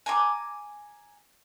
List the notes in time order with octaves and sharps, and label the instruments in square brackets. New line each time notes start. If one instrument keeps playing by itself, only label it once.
[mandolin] G#5 A#5 D6